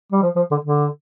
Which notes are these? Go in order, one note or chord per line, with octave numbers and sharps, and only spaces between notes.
G3
F3
F3
D3
D3